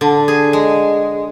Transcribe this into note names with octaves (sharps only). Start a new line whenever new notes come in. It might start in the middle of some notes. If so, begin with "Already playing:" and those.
D3
G#4
G#3